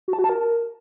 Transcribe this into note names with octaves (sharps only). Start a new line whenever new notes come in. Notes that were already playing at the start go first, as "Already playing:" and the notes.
F#4
A5
F#4
A5
A#4